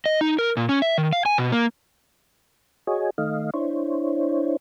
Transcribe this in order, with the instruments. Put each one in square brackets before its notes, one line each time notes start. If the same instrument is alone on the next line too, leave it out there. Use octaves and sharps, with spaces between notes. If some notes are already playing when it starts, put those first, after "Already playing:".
[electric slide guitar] D#5
D#4
A#4
A#2
C#4
E5
D#3
F5
G#5
B2
A#3
[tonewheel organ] F#4 G#4 C#5 D#5 G#5
D#3 A3 D#5 F5
D4 E4 C5 C#5